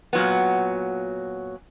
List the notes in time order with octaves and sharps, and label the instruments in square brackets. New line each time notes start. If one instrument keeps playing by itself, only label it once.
[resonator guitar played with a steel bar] A#2 F#3 B3